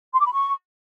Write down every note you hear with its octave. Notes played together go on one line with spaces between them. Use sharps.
C6
D6
B5
C#6